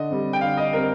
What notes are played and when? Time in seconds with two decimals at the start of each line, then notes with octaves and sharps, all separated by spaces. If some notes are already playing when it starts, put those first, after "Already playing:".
Already playing: D3 D#5
0.10 G3 C4
0.33 G5
0.41 D3 F5
0.57 D#5
0.73 G3 C4 A#4